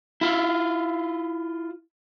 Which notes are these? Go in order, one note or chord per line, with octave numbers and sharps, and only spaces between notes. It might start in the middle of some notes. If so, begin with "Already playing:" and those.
E4 F4